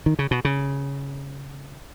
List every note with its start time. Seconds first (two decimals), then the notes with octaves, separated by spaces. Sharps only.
0.06 D#3
0.19 C#3
0.31 B2
0.45 C#3